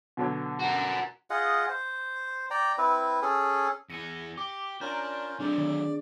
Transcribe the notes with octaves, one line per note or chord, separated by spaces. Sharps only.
B2 D3 F#3
F#4 A#4
F4 G#4 D#5 F#5
C5
D5 G5 A#5
C4 E4 B4
C#4 G#4 A4
E2 G#4 A#6 C#7 D#7
G4 D6
C#4 D4 F4 A#4 A#5 G6
F#3 A3 C4 D4 G#4 D5
D#3